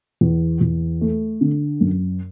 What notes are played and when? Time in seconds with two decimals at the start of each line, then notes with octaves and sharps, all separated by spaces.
0.21 E2
0.61 E2
1.01 A3
1.41 D3
1.81 F#2